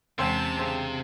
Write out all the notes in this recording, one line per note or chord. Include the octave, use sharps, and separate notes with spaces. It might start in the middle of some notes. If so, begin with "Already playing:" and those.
E2 C3 E3 G#3 C4 C#4 A5
C#3 C4 D4